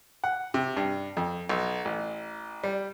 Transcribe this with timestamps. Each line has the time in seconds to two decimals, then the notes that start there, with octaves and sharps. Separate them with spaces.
0.24 F#5
0.54 C3
0.77 G2
1.17 F2
1.49 B1
1.85 A1
2.63 G3